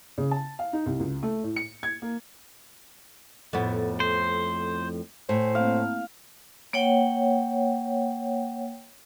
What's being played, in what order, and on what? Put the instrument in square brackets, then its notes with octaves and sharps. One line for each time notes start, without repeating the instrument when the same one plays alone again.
[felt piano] C#3
A5
F5
D#4
C2
C#2
A3
A2
C#7
G#6
A#3
[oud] F2 A2 B3
[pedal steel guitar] C5
[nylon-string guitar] A2 [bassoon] C5 [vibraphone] G#5
[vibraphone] A3 A#3 C4 [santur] F5
[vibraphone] A#3 C#5 F#5 G5